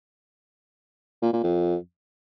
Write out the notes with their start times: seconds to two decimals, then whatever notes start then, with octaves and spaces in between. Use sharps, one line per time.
1.22 A#2
1.33 A#2
1.44 F2